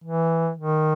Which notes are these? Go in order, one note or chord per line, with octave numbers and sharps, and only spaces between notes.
E3
D#3